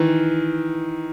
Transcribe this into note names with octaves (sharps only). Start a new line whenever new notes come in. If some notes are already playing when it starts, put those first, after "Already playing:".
Already playing: D#3 E3